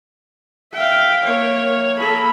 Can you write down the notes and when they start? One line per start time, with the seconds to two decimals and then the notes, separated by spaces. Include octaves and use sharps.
0.73 E5 F5 G5
1.24 A#3 C#5
1.99 A#3 A4 B5